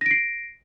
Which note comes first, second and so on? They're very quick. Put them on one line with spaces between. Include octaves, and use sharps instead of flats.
A#6 D7 C7